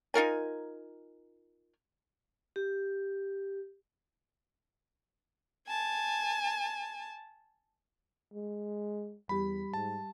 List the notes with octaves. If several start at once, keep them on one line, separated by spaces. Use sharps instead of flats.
D#4 F4 A#4 G#5
G4
G#5 A5
G#3
E2 G3 G4 B5
G#2 A5